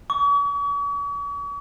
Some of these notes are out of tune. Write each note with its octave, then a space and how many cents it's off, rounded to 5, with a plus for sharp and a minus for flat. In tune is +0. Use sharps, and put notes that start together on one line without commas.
C#6 +45